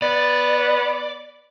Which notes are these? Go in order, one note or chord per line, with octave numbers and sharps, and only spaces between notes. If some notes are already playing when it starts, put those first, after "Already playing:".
B3 D5